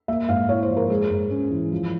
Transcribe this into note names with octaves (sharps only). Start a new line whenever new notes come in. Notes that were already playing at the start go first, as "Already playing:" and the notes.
A#3 E5
G#2 F5
E4 C#5
C5
F3
A#4
G#3 G#4
G#2
C#4
E3
F3